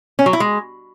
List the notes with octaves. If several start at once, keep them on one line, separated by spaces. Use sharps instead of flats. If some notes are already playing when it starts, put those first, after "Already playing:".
C#4
F#3
E4
G#3